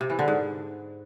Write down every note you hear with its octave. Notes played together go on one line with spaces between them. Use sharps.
C3
E3
D3
G#2